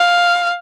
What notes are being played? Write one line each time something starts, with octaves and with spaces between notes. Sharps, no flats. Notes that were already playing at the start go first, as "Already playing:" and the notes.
Already playing: F5